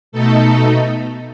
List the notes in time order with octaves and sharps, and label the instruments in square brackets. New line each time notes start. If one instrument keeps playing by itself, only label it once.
[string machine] B2 A3 D#4 A4